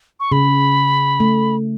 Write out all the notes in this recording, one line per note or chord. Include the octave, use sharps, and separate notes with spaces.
C#6
C#3 B5
A3